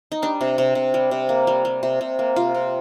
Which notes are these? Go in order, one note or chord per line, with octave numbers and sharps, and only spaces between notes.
D#4
G3 D4
C3
C3
C3
G3
C3
A#3
G3
G3
C3
C3
A#3
C3 F4
C3